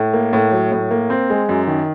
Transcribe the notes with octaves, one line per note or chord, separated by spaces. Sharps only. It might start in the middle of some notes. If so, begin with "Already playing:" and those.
Already playing: A2
A#3
A2
F#3
A2
A#3
C4
G#3
F#2
D#3